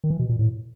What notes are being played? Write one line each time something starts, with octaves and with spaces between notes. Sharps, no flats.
D#3
E3
B2
A#2
A2